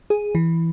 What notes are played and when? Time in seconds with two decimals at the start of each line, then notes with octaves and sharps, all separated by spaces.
0.10 G#4
0.35 E3